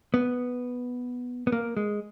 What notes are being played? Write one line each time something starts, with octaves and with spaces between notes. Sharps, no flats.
B3
B3
A#3
G#3